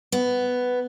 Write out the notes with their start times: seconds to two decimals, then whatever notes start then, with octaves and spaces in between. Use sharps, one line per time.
0.12 B3